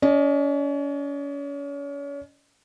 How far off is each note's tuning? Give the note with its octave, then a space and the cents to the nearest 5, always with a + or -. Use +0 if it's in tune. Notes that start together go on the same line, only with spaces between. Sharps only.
C#4 +35 D#5 -35